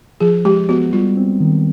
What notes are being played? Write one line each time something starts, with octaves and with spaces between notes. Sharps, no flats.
F3 G#4
G#3 G4
B3 F#4
G3 F4
C4
D#3